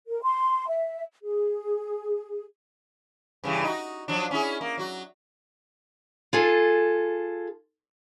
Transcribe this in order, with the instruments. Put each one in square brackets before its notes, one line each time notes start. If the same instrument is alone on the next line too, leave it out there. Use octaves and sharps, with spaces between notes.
[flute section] A#4
C6
E5
G#4
[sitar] G2 C#3 E3
D#4 F#4
F3 F#3 D4
C#4 E4 G#4
A#3
F#3 F#4
[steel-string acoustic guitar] F4 G#4 A4